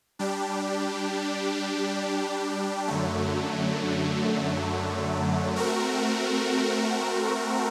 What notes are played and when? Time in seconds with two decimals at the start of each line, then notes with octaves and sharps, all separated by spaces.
0.19 G3 D4 G4
2.88 F#2 D3 F#3 A3
5.56 A3 C4 F#4 A#4